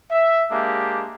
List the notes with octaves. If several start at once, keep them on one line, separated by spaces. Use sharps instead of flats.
E5
G#3 A#3 D4 G4